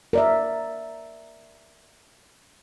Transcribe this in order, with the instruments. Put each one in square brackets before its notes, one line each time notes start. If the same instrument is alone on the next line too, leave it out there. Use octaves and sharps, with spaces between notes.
[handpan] A#4 D5 E5